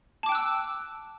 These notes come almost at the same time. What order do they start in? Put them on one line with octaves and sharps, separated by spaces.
A5 D6 G5 F#6 E6